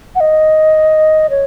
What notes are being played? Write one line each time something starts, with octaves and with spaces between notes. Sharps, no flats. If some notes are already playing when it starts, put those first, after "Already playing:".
F#5
D#5
C#5